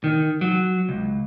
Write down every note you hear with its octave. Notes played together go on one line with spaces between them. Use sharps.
D#3
F#3
C#2